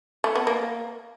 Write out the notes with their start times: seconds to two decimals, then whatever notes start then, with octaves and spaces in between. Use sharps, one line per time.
0.24 A3
0.35 B3
0.47 A#3